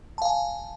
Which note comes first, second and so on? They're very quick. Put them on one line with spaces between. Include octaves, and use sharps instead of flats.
A5 F5 G#5